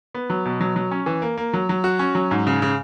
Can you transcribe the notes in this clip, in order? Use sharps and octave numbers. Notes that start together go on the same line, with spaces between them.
B3
F#3
B2
F#3
F#3
C#4
E3
A#3
A#3
F#3
F#3
F#4
C#4
F#3
G#2
C#3
C#3